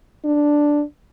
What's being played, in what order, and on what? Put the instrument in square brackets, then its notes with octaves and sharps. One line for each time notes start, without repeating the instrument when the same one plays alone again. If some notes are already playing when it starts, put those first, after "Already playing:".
[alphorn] D4